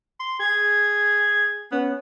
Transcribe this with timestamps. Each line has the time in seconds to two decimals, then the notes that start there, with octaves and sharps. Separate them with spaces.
0.20 C6
0.39 G#4 G#6
1.72 B3 C#4